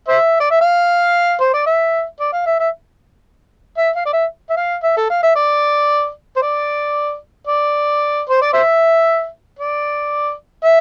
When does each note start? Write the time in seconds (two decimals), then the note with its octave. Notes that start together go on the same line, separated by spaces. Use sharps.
0.08 C5 E5
0.40 D5
0.51 E5
0.61 F5
1.41 C5
1.53 D5
1.66 E5
2.20 D5
2.33 F5
2.46 E5
2.59 E5
3.77 E5
3.96 F5
4.06 D5
4.13 E5
4.50 E5
4.57 F5
4.83 E5
4.97 A4
5.10 F5
5.23 E5
5.36 D5
6.36 C5
6.42 D5
7.47 D5
8.29 C5
8.41 D5
8.53 C5 E5
9.59 D5
10.64 E5